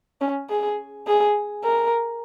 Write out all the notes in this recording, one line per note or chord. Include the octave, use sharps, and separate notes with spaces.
C#4
G#4
G#4
A#4